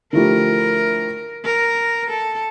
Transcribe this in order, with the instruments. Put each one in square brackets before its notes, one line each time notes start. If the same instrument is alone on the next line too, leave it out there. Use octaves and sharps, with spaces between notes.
[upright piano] D3 F3 A3 E4 G4 [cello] A#4
[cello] A#4
A4